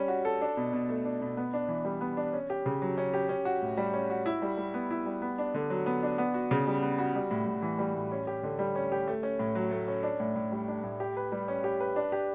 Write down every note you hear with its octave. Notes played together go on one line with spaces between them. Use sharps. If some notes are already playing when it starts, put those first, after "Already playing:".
Already playing: G3 C#4
F#4
A4
D4
B2
B2
A3
D4
B2
B3
D4
E3
G3
B3
D4
C#4
G4
C#3
F#3
C#4
G4
C#4
F#4
A2
G3
C#4
F#4
E4
G3
G3
B3
E4
G3
B3
D4
D3
F#3
B3
D4
B3
F#4
C#3
G3
B3
F#4
G3
A2
A2
E3
G3
A2
C#4
G4
D3
G3
C#4
G4
A3
C#4
A2
F#3
A3
C#4
D4
A2
A2
G3
D4
A2
G4
B4
G3
C#4
G4
B4
D4
G4